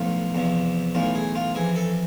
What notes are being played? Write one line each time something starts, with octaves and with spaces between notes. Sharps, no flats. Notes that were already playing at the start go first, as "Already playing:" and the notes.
Already playing: B1 A2 F3 F4
E2 C3 F3
B1 A2 E3 F4
G#4
F4
F2 E3 G#4
A4